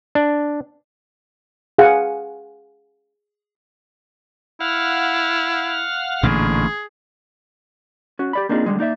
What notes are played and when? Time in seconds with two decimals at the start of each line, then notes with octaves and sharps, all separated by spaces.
0.15 D4
1.78 G#4 F5 F#5 G#5
4.61 E4 F5 F#5 F6
6.23 A1 A#2 D3 G#4
8.19 C#4 F#4
8.33 G4 D5 B5
8.49 A#3 C4 D4 D#4 F4 G#4
8.66 D3 G3 G#3
8.79 A#3 D#4 D5 E5